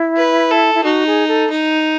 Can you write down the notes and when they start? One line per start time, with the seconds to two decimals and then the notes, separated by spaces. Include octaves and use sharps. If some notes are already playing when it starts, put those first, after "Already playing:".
Already playing: E4
0.17 B4
0.51 A4
0.75 E4
0.84 D#4 F#4
1.07 G#4
1.28 A4
1.50 D#4